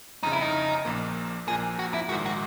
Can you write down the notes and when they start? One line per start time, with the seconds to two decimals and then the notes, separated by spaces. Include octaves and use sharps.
0.23 G1 F2 C#3 D#4
0.32 E4
0.42 D#4
0.85 A#1 A#2 F3 A#3
1.47 A#1 A#2 F3 A#3 G#4
1.79 F#4
1.94 E4
2.09 A#1 G#2 D#3 G#3 F#4
2.26 F#4